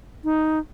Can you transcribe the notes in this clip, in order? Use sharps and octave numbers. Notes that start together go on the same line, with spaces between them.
D#4